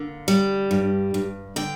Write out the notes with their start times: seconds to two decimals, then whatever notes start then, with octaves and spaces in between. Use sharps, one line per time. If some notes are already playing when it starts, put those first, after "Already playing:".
Already playing: D3 A#3
0.28 G3
0.71 G2
1.14 G2
1.56 D3 G5